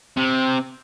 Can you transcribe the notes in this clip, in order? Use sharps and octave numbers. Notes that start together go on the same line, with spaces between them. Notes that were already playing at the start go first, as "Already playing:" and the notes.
C3